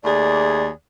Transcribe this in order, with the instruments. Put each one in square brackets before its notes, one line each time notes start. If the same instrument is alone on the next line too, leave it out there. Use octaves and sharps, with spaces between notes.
[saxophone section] D#2 A3 G#4 [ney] D5